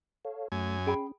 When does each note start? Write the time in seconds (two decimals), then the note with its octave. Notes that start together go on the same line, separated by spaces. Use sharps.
0.25 A4 C#5 F5
0.52 F#2 A3 G#5
0.86 C#4 G#4 G5 B5